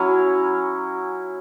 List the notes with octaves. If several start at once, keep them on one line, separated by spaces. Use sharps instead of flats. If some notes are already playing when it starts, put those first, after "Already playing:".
Already playing: F#3 C#4 E4 G#5